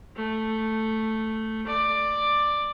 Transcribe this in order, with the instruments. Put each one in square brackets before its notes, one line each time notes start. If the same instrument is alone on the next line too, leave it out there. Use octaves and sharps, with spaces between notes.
[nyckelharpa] A3
D5